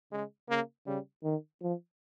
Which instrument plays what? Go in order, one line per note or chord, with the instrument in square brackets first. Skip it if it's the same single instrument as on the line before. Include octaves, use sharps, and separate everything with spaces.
[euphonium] C#3 [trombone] G#3
[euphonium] C#3 [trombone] A#3
[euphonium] C#3 [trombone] G3
[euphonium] D#3
F3